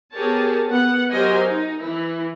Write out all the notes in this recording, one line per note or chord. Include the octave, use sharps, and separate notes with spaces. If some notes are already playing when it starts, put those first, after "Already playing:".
B3 G4 G#4 A#4 C#5 A5
B3 F#5
F#3 G4 A#4 C5 D#5 G#5
D#4
E3 E4